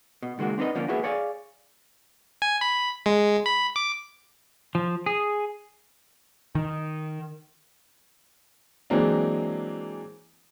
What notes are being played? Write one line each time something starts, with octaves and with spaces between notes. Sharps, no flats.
B2
C#2 D#3 G#3 A#3 F#4
C4 D4 D#4 B4 D#5
D3 F3 A#3 C#4
A#3 B3 E4 F#4 G#4 B4
G#4 C#5 D5 F5 G#5
G#5
B5
G#3
B5
D6
F3
G#4
D#3
E3 F#3 G#3 A#3 C4 D4